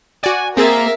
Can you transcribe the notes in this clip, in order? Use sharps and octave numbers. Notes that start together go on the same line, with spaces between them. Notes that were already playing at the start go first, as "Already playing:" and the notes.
F#4 D5 G#5
A#3 C4 G#4 A#4 E5 F5 A6